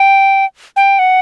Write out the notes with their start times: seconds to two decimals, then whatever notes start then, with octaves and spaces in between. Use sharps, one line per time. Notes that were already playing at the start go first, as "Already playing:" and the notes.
Already playing: G5
0.76 G5
0.99 F#5